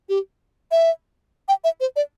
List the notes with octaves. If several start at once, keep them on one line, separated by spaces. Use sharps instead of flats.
G4
E5
G5
E5
C5
D5